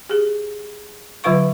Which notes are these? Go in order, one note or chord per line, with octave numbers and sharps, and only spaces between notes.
G4 G#4
D3 F#3 F4 B4 F5 C#6